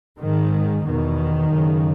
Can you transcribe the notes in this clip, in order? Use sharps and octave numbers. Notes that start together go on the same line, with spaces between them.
G#2 D#3
E2 B2 D#3
F#2 C#3